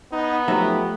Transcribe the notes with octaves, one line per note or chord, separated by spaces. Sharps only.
B3 D#4
F3 F#3 A3 D#4 G4 E5